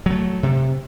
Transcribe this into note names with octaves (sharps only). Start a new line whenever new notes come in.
F#3 A3
C3